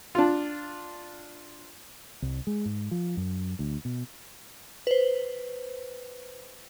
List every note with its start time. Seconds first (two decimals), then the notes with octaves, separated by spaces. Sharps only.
0.15 D4 F4
2.22 C2
2.47 G#3
2.65 G#2
2.91 F3
3.17 F#2
3.59 D2
3.85 B2
4.87 B4 C5